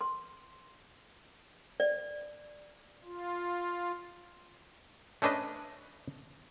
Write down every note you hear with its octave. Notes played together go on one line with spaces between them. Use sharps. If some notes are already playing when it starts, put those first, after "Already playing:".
C6
D5
F4
A3 C#4 D4 B4 D#5